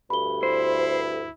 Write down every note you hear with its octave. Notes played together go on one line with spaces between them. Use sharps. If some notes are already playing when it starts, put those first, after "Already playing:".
D2 G2 B5 G7
E4 C5